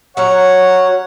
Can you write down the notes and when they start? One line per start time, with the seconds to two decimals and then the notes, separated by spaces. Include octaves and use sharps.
0.17 F#3 C#4 C#5 F#5 A#5